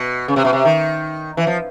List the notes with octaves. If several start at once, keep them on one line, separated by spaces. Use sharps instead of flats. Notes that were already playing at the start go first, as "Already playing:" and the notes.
Already playing: B2
C#3
C3
B2
C3
D#3
E3
F3